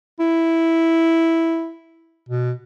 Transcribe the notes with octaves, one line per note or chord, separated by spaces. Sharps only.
E4
B2